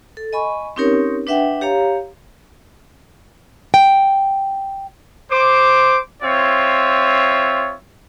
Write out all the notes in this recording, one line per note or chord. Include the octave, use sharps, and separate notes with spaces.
A4
D#5 G#5 B5 C#6
C4 C#4 D#4 G4 A#4 C#5
D4 B4 E5 F#5 G5
G4 C#5 F5 A#5
G5
C5 D6
C4 F4 C#5 E5